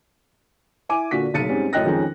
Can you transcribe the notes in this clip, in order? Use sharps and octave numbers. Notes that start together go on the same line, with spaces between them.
E4 G#5 D6 D#7
A#2 D3 F#4 B6
F#1 B1 A6 C#7 D#7
G#2 G3 C4 C#4
F#2 A2 D#5 G5 F#6 A#6
F2 D#3 G#3 C#4 D#4